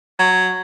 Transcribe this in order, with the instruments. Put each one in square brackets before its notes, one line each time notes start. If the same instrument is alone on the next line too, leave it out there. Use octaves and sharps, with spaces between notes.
[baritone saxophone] F#3